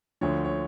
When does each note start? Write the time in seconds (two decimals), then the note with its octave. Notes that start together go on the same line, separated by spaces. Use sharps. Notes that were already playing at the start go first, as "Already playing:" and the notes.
0.21 D2 D3 F3 C#5
0.45 C#5